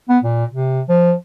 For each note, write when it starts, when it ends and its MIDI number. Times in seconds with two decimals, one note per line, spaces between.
0.09 0.18 59
0.24 0.44 46
0.52 0.82 48
0.89 1.14 53